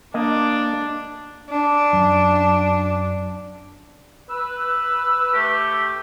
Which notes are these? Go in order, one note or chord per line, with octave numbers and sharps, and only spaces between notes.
A#3 D4 D#5
D4
F#2
B4 E6
A3 G4